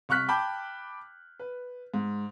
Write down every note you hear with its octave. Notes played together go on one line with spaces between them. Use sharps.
C2 C#6 F6 F#6 B6
G5 A5 B5 D6 G6
B4
G#2